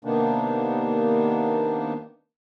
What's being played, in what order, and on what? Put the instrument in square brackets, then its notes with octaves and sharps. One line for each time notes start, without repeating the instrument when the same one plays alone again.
[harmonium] C3 D#3 A#3 B3 D4 D#4